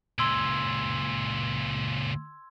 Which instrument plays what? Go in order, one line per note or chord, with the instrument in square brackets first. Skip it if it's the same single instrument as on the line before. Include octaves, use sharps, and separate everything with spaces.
[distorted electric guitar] C#2 A#2 [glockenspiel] C6 E6 G#6